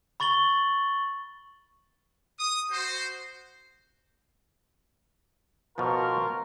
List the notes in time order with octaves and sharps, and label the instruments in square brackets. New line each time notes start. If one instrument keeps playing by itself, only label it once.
[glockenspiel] B5 C#6 A6 F#7 G7
[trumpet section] D#6
F#4 C5
[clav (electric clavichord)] B2 F3 [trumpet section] F4 A#4 C#6